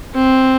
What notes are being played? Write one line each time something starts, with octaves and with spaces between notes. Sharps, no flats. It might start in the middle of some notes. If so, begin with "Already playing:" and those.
C4